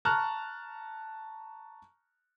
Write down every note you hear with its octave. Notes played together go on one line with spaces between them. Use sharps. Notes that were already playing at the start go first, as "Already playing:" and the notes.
A5 A#5 C#6 F6 F#6